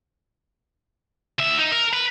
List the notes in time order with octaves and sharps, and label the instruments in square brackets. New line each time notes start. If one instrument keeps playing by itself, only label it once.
[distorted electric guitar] D2 E5
D#4
A#4
B4